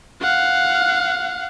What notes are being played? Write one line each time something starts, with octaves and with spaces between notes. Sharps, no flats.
F5 F#5